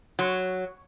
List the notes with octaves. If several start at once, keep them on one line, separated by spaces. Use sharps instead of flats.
F#3